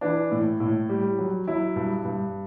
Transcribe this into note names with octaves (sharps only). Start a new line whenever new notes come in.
E3 D4
A2
A2
G3
F#3
F#3 E4
G2
G2